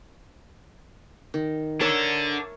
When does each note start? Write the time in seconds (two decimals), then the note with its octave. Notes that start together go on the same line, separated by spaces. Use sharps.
1.34 D#3
1.81 D4 A4 A#4 C#5 E5